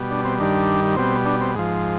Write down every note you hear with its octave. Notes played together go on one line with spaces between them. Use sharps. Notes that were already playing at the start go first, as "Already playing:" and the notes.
Already playing: B2 G3
D4
C4
G2 D#3 G3 D4
B2 G3 C4
D4
C4
G#2 F3